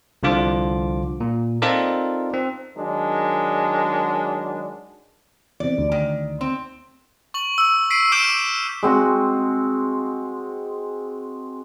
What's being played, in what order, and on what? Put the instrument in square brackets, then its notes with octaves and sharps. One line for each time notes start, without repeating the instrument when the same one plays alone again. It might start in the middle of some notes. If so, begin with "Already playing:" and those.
[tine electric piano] C2 D3 F3 F4 D6
A#2
C4 D#4 F4 A4 A#4 D5
C4
[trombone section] D#3 F#3 G#3 D4
[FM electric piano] E2 C3 [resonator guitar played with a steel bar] D5
[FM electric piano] D2
[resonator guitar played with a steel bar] D#3
C4
[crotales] C#6 F#7
E6
B6 C7 D7 D#7
D6 E6 F6 G6 D7 E7
[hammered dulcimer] G#3 C4 F#4